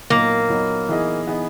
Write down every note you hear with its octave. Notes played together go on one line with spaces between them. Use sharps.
A#2 F#3 A#3 B3 D#4
A#2 F#3 B3 D#4
E3 B3 D#4 G#4 D#5
E3 B3 D#4 G#4 D#5